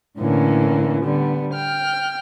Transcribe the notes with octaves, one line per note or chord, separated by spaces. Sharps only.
A2 D3 E3 A#3 C#4
D3 G3 B3
G5 F6